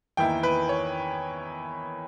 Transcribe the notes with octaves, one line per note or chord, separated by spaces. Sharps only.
E2 D#3 A#3 E4 G5
B4
C#5